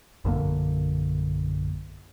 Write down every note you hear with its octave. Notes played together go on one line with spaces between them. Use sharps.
A#1 F#2 D3 A#3